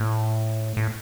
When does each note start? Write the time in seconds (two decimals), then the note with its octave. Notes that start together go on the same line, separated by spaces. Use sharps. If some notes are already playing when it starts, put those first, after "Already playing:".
Already playing: A2
0.77 A2